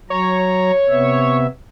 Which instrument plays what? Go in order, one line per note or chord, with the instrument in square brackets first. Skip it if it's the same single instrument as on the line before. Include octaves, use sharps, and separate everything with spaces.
[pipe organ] F#3 A#5 [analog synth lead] C#5
[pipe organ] C3 B3 E5